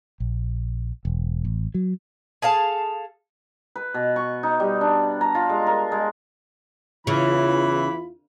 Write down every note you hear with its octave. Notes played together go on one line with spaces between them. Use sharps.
A#1
E1
A1
F#3
G#4 A4 F5 A5
B4
B2
C#6
D#4
G3
D4
A#5
F4
G#3
A#4
G#3
E2 C#3 E3 E4 F4 B5